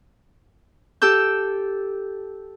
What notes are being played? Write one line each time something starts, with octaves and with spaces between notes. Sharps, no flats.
G4 A4 E6 G6